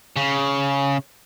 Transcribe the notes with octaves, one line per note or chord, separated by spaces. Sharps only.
C#3